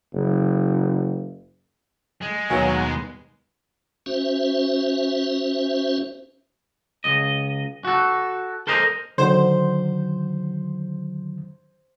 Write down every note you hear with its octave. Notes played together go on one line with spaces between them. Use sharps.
F#1
G#3
D#2 B2 F#3 B4 F5 G#5
C#4 F#4 C5 E5
C#2 D#5
F#4 A4
A4 A#4 C5 D#5 A5 A#5
D3 D#3 F#3 C5